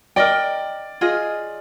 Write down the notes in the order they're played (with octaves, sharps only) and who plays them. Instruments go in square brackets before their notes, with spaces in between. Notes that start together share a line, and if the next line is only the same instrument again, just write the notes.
[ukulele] A#4 D#5 G5 [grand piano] D5
[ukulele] F4 G#4 D#5